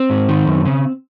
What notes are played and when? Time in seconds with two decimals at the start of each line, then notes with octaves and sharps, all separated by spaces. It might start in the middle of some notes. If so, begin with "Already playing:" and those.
Already playing: C4
0.10 G#2
0.29 D#3
0.47 F#2
0.65 C#3